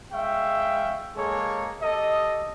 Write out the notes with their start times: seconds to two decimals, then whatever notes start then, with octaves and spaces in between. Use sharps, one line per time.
0.13 G#3 E5 F5 G5 C#6
1.16 G#3 A#3 G#4 A4 C#5
1.82 G4 A4 D#5